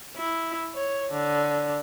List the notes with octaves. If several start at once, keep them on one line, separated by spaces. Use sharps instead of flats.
E4
C#5
D3